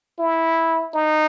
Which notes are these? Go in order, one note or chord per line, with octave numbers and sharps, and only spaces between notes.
E4
D#4